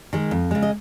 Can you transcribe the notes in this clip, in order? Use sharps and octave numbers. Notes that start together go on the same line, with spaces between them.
D#3 G#3
F2
C#3 G#3
D#5